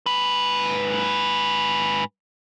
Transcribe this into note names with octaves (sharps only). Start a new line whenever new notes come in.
G#2 B4